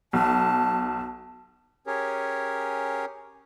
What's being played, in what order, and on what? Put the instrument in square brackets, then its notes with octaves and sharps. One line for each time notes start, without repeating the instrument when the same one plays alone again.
[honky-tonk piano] B1 [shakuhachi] A5
[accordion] C#4 G4 G#4 A#4 C#5